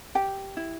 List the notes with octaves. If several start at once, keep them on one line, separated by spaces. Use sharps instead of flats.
G4 G5
E4